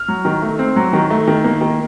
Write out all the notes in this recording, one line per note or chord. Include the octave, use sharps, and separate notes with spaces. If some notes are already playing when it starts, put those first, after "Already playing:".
Already playing: F6
F#3
D#3
A3
C4
F#3
D#3
A3
D#3
A#3
D#3